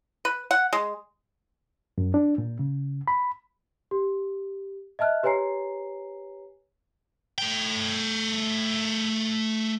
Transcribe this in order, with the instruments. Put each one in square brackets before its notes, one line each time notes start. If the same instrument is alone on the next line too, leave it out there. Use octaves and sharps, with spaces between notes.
[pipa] B4
F#5
G#3
[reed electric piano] F#2
D4
A#2
C#3
B5
[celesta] G4
D#5 E5 A5 F6 F#6
G4 B4 C#5 G#5 A#5 C7
[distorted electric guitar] A3 G5